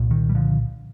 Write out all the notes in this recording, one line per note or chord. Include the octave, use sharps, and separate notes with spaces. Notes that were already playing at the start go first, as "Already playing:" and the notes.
Already playing: C2 A#2
D#3
G3
D3 F3